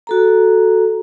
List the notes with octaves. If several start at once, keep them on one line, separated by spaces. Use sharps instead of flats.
F#4 A4 A#5